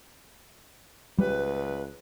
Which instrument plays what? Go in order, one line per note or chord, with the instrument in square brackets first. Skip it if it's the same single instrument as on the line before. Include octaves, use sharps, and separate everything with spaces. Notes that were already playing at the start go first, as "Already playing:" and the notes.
[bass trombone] C#2 [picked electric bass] G3 [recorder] B4